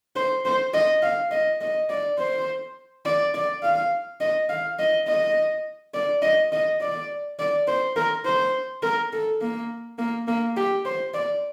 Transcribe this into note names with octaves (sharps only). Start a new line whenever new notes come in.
C5
C5
D#5
F5
D#5
D#5
D5
C5
D5
D5
F5
D#5
F5
D#5
D#5
D5
D#5
D#5
D5
D5
C5
A#4
C5
A#4
A4
A#3
A#3
A#3
G4
C5
D5